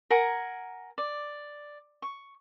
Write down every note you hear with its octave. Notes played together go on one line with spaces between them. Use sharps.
A#4 F#5 G#5 A#5
D5
C#6